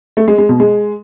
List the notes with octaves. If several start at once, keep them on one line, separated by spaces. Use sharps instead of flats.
A3
G#3
G#3
B2
G#3